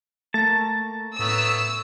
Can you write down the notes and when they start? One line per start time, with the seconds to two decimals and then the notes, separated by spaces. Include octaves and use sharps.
0.34 A3 A#3 A5 A#5
1.19 A2 A3 B3 C#5 A#5 E6